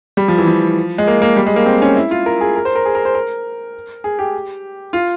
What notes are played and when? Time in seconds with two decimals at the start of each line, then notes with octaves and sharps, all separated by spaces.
0.17 G3
0.28 F3
0.38 E3
0.47 F3
0.98 G#3
1.07 A#3
1.22 A#3
1.36 G3
1.46 G#3
1.56 A#3
1.66 C4
1.82 C#4
1.96 E4
2.11 F4
2.26 A#4
2.41 G#4
2.56 A#4
2.65 C5
2.75 A#4
2.85 G#4
2.95 A#4
3.05 C5
3.15 A#4
4.04 G#4
4.19 G4
4.93 F4